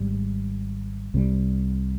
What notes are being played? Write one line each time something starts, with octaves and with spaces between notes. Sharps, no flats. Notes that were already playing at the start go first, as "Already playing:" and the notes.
Already playing: G#1 G#2 G3
C2 C3 G3